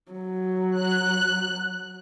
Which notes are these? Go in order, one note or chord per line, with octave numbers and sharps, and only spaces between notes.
F#3
F#6